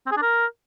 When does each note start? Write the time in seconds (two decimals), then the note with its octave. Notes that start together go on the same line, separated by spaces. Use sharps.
0.06 C4
0.12 G#4
0.17 D4
0.22 A#4